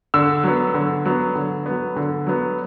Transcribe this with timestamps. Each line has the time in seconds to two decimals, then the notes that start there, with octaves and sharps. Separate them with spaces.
0.14 D3 E6
0.44 F#3 B3
0.74 D3
1.06 F#3 B3
1.35 D3
1.66 F#3 B3
1.96 D3
2.27 F#3 B3